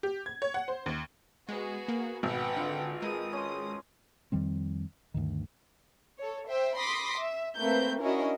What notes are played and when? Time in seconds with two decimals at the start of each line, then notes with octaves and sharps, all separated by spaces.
0.03 G4
0.26 G#6
0.42 C#5
0.54 F#5
0.68 C5
0.86 D#2
1.49 G#3 B3 F#4 G#4
1.88 A#3
2.23 G#1 B2 B4 F#5 G5
2.56 D3 C4 F4 F5
3.02 G#3 A#4 B4 D#6
3.33 C#4 C6
4.32 F2 D#3 G3 C4
5.14 D2 G2 D#3
6.18 A4 C#5
6.48 C5 E5 G5
6.77 B5 C6 D6 D#6 A#6 B6
7.17 E5
7.59 A3 A#3 C4 B4 G6
8.01 C#4 D4 E4 F#4 A#4 D#5